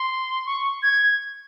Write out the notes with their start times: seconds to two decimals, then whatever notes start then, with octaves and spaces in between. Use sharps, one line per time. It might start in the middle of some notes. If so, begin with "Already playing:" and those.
Already playing: C6
0.46 C#6
0.83 G#6